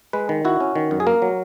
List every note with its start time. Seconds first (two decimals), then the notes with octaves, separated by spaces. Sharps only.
0.13 G#3 B4
0.29 D#3
0.45 E4 F#4
0.60 C#4
0.76 D#3
0.91 F#2
1.00 G#4
1.07 A#3 A#4
1.22 F#3